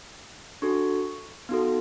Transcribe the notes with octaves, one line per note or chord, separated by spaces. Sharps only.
D4 F#4 A4 C#6
B3 D#4 F#4 A4